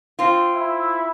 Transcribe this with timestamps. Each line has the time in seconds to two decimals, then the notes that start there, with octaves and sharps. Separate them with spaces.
0.19 C4 F4
0.54 E4